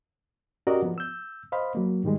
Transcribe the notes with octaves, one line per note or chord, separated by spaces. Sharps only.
C#4 F#4 G4 A#4 D5 D#5
F3 B3
E6 G6
C5 D#5 F5 B5
F#3 A#3
G#2 D#3 G3 G#3